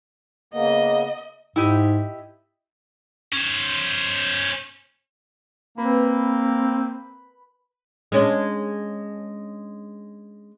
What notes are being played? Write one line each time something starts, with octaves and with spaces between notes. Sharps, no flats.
C#3 A#3 B3 D#5
G#2 E4 G4 D#5
C#4 C5
A#3 C4 B4
G#3 C#4 D4